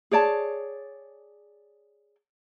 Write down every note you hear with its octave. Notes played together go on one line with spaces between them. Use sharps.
G#4 C#5 D5 A5